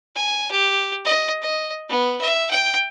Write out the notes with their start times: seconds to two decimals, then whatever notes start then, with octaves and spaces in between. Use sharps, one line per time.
0.16 G#5
0.51 G4
1.05 D#5
1.42 D#5
1.89 B3
2.21 E5
2.51 G5